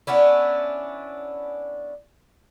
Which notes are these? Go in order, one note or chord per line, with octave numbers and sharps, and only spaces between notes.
B3 C#4 D4 E4